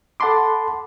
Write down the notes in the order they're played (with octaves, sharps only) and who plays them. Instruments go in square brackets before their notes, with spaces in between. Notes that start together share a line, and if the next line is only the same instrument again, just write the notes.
[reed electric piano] A4 F#5 A5 B5 C6 D6